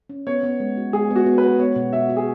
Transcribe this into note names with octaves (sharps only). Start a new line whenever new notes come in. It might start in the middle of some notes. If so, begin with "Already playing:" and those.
C#4
B3 C#5
B3
G#3
F#4
G#3 G#4
B3
F#4
B3
B4
F#4
B3 C#5
B2
F#4 E5
F#4
G#4